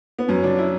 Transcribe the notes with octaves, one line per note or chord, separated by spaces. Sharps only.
B3
F#2 C#4
D3 D4
E4